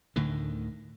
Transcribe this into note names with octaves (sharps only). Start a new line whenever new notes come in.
D2 A2 D3 D#3